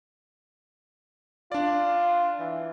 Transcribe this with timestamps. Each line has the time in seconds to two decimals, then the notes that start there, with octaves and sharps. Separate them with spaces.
1.52 D4 F4 D5
2.39 E3